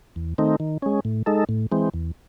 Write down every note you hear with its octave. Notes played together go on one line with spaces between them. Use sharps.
E2
D#3 A3 C4 D#4
D#3
G#3 C#4
A2
G#3 D#4 A4
A2
E3 G#3 C4
E2